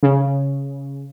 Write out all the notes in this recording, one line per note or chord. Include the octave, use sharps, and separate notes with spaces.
C#3